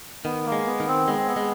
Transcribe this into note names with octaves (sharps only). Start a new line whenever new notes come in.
D#3 B3
A#3
G#3
B3
D#3
C4
G#3 B3
C4
B3
G#3